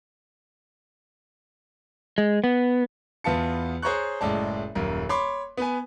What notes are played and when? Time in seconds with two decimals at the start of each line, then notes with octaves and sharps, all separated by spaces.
2.18 G#3
2.44 B3
3.24 E2 B3 F4 A5 C#7
3.82 G#4 C5 C#5 A#5 C#6 F#6
4.21 F#1 A2 G#3 D5 A5
4.75 D#1 F#2 A#4
5.09 C#5 B5 C6 D6
5.57 B3 B4 G#5